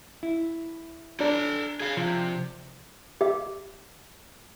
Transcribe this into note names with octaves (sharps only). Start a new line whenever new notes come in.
E4
D4 A4 A#5
G#4 F5
C3 F3
G4 E5